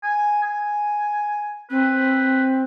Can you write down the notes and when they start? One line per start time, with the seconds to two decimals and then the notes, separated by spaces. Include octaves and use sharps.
0.03 G#5
0.43 G#5
1.70 C4 B4